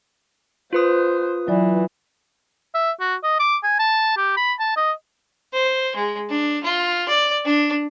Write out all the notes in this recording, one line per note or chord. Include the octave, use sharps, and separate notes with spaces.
F4 B4 C5 D#6
E3 F#3 D5
E5
F#4
D#5
D6
G#5
A5
G4
B5
A5
D#5
C5
G#3
D4
F4
D5
D4